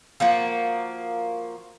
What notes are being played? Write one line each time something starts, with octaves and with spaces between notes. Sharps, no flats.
F3 A#3 F#4